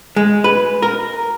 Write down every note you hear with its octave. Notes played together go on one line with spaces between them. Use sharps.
G#3
B4
A#4